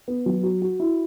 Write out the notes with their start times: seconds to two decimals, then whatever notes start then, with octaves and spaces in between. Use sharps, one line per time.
0.08 B3
0.26 F#3
0.43 F#4
0.62 F#4
0.80 E4